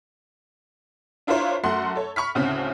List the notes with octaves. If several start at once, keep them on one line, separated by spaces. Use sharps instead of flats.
D4 E4 F4 A#4 C5 C#5
F#2 A3 F#5 C6
A4 C#5
B5 C#6 F6 B6
D2 A2 C#3 C4 C#4